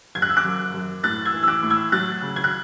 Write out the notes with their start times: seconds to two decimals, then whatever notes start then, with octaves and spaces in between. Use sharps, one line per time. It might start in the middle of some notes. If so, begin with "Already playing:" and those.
0.15 F#1 G#6
0.22 F#6
0.29 E6
0.36 D6 F#6
0.44 F#2
0.74 F#2
1.03 A2 F#6 A6
1.25 E6 G#6
1.33 E3
1.43 E6
1.48 D6 F#6
1.63 A2
1.70 E6 G#6
1.92 F#3 F#6 A6
2.22 C#3
2.36 G#6
2.44 F#6